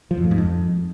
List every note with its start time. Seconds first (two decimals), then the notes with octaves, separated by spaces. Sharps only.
0.11 F3
0.18 F2
0.24 A2
0.31 G#2
0.38 F2